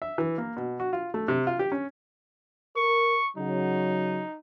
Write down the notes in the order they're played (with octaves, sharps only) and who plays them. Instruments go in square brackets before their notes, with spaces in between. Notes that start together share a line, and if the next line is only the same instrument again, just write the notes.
[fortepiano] E5
E3
A#3
B2
F#4
F4
A3
C3
F4
G4
C#4
[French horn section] A#4 [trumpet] C#6
[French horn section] C#3 F#3 [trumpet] D#4